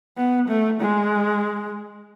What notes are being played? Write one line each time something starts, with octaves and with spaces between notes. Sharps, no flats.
B3
A3
G#3